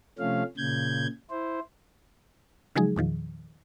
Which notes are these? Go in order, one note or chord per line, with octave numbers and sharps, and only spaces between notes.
C3 F3 A3 C#4 F5
A#2 C#3 G6 G#6
E4 C5
C#3 F3 F#3 G#3 D#4 G#4
E2 A#2 D#3 F3